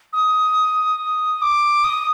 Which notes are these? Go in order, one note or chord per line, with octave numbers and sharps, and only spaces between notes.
D#6
D6
D#6